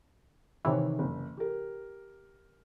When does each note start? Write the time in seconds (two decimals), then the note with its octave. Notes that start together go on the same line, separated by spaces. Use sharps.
0.65 C3 D#3 E3 C#5
0.99 F#1
1.37 G4 A#4